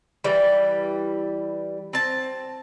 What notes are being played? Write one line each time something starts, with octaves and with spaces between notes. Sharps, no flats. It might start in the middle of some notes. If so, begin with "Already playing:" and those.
E3 G3
C4 A5